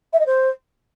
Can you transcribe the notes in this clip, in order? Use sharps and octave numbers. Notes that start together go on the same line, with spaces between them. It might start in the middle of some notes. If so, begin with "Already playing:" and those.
E5
D#5
C5